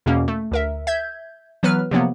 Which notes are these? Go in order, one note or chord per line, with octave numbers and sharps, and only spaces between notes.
E2 B2 A#3 C#4
A3
D2 A#4 E5
E5 G6 G#6
E3 F#3 B3 B4 F6
C3 F3 F#3 A#3 B3